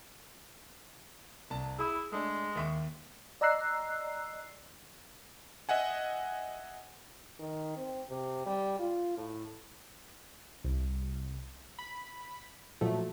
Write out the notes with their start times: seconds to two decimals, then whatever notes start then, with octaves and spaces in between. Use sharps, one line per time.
1.50 C2 A5
1.79 E4 G#4 B5 D#6
2.12 G#3 A3 D4
2.55 D#2 E5 C#6
3.41 D5 D#5 A#5 E6 F#6 C7
5.69 D#5 E5 F#5 G#5
7.39 D#3
7.76 C4
8.10 C3
8.46 G3
8.79 F4
9.17 A2
10.64 C2
11.79 B5
12.81 A#2 F3 F#3 A3